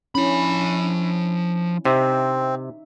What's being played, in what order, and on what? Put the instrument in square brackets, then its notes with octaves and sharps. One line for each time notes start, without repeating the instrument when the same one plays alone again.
[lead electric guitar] F3 B5 [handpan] C#4 D4 E4
[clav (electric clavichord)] C3 [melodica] C4 [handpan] D#4 E5